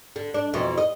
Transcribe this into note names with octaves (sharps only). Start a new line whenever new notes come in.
D3
D4
F2 B2 E3
D#5